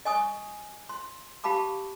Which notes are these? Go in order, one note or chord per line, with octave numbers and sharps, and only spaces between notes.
D#5 G#5 C#6 D#6
C6
G4 F5 A5 B5 D6